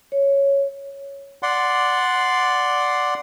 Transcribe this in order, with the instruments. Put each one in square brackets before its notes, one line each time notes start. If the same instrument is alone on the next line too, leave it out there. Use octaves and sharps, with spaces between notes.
[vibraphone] C#5
[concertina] D5 F#5 C6